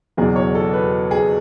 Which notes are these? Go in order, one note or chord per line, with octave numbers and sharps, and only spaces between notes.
F#1 E2 B2 F#3 G#4
C#5
A4
B4
G#4